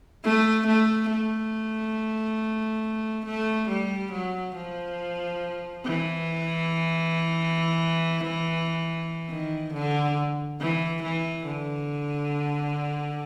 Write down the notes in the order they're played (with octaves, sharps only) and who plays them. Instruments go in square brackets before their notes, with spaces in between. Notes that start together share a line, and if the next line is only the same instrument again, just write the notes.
[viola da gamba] A3
A3
A3
A3
G3
F#3
F3
E3
D#3
D3
E3
E3
D3